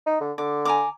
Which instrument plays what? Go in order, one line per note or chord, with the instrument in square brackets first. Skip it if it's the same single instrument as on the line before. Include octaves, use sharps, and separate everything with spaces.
[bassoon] D#4
D3
[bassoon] D3 [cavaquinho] D6
[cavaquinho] G#5 A#5 D6